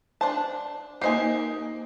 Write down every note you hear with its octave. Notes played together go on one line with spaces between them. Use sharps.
D4 C5 A5
A#3 D#4 G4 C5 G#5 C7